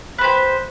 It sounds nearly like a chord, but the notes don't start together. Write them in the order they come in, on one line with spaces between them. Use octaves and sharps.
B4 C5 G4